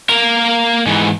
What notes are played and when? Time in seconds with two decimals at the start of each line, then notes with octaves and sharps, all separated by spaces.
0.09 A#3 A#4
0.87 G#2 E3